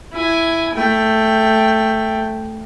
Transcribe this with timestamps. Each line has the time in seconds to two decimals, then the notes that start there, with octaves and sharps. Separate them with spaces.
0.12 E4 G#5
0.75 A3 G5